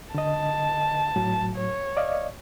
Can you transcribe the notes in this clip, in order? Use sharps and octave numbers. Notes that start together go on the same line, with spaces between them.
D3 D#5 A5
A2 F#3
C#5
D5 D#5 F5